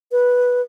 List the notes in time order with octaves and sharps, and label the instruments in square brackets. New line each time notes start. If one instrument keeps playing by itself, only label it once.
[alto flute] B4